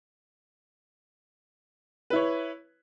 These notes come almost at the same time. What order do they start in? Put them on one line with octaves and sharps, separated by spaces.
B4 E4 C#5